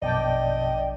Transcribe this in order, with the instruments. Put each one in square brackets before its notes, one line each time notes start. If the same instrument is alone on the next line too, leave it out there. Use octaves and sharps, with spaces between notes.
[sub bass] A#1 [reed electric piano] F#2 B2 A5 [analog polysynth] D5 G5 [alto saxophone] D#5